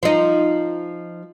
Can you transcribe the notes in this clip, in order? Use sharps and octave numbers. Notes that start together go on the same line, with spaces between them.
F3 D#4